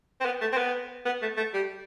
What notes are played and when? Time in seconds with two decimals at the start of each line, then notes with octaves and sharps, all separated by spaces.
0.20 C4
0.25 B3
0.41 A3
0.52 C4
0.57 B3
1.05 B3
1.22 A3
1.37 A3
1.54 G3